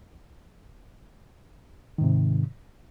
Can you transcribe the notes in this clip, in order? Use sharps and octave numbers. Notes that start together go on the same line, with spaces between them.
G#2 C3 D#3